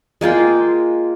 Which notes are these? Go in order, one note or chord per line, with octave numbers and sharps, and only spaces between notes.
G#3 A#3 F4 G5